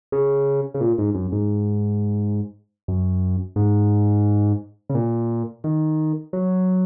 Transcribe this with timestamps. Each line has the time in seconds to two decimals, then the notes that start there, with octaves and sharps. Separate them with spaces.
0.12 C#3
0.74 C#3
0.81 A#2
0.98 G#2
1.15 F#2
1.32 G#2
2.88 F#2
3.56 G#2
4.90 C#3
4.95 A#2
5.64 D#3
6.33 F#3